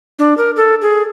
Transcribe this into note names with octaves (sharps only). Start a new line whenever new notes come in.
D4
A#4
A4
G#4